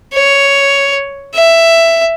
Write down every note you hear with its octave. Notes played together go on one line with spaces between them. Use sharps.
C#5
E5